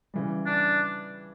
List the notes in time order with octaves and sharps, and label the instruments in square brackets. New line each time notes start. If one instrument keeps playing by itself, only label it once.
[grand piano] C#3 E3 G3
[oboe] D4